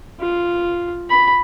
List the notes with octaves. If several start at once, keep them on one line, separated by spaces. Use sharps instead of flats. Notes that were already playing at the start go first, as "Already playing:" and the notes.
F4
B5